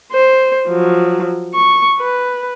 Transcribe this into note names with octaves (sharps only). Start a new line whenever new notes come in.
C5
F3 F#3
C#6
B4